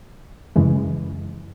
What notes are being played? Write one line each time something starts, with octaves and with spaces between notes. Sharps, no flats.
F#2 C#3 E3 G#3